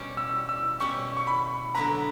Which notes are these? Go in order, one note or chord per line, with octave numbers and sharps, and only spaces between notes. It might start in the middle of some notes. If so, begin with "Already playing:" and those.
Already playing: B2 G3 C#4 G4
E6
E6
B2 G3 C#4 G4 C#6
C#6
B5
D3 F#3 B3 E4 B4 A#5